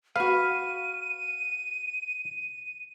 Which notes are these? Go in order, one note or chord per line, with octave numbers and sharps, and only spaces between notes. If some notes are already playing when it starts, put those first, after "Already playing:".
F#4 B4 F5 D#7